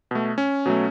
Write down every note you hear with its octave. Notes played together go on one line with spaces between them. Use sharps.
B2 A3
C#4
B2 F#3 A3